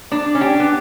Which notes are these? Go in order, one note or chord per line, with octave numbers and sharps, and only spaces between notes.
D4 D5
C#4
D4 G4
B3